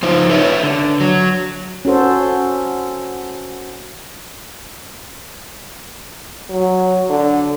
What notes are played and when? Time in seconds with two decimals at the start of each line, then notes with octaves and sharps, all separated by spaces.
0.03 F3 D#4 F4 C5
0.29 A4 B4 C#5 E5
0.63 D3
1.00 F#3
1.85 C#4 F#4 A4 C5
6.50 F#3
7.10 D3